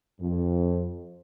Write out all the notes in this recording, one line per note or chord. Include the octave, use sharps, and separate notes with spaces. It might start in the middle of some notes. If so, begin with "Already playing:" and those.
F2